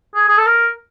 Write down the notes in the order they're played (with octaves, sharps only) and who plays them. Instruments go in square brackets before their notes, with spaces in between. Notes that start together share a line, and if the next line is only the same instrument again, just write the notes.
[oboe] G#4
G#4
A4
A#4